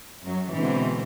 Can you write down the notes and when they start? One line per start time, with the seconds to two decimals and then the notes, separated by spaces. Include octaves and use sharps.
0.23 F#2 F#3
0.54 B2 D3 E3 G#3 C4